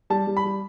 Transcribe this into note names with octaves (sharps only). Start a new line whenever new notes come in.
G3 A5
G3
B5
G3